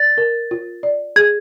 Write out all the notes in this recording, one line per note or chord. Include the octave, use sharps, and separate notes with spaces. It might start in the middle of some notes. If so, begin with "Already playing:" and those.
Already playing: D5 A6
A#4
F4
D5
G#4 G#6